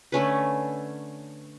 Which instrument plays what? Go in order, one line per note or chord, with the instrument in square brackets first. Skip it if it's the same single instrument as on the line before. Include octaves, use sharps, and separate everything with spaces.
[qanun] D3 A3 C#4 B4